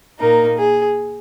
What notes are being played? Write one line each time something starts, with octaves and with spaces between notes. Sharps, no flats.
A#2 A#3 D#4 A#4
G#4